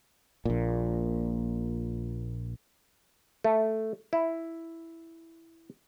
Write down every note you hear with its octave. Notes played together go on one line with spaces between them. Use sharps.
A#1 A#2
A3
E4